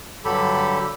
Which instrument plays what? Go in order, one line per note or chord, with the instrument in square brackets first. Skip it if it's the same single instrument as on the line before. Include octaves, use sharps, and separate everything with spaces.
[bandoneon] G2 D3 F#3 G4 A4 B5